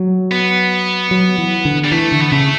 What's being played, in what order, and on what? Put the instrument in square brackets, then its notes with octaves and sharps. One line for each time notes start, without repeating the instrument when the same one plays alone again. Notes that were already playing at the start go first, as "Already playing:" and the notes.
Already playing: [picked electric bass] F#3
[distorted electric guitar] B3
[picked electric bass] F#3
E3
D3
[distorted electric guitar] G3
[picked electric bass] E3 [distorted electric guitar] A3
[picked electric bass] D3
[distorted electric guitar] B3
[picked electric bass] C#3 [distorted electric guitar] A3